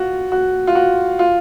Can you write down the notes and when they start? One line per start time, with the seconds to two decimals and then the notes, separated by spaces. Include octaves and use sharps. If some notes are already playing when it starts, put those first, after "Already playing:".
Already playing: F4 F#4
0.32 F#4
0.67 F4
0.75 F#4
1.19 F4